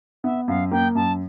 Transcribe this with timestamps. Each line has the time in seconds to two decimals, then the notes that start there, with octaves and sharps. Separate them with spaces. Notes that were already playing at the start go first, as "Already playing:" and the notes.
0.24 B3 E5
0.48 F#2 F5
0.71 A#3 G5
0.95 F#2 A5